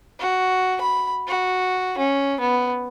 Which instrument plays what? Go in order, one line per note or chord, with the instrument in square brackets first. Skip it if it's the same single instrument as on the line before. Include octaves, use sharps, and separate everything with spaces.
[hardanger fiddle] F#4
B5
F#4
C#4
B3